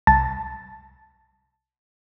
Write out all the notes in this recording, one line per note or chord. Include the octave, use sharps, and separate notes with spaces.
C2 A5 A6